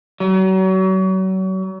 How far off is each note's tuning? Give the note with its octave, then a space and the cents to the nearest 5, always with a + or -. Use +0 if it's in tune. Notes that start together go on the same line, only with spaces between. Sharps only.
F#3 +35